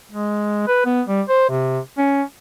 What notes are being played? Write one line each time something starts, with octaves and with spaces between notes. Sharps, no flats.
G#3
B4
B3
G3
C5
C3
C#4